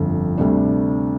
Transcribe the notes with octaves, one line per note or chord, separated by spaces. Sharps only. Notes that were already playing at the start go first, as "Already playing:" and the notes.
Already playing: G1 F2 D3
D2 C3 G3 D4